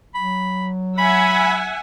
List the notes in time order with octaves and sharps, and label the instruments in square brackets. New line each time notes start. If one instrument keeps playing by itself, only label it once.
[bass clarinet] F#3 [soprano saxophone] B5
[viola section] E5 F#5 G#5 [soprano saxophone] B5